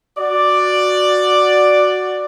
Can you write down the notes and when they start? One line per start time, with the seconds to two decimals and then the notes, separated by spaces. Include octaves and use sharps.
0.17 F#4 D5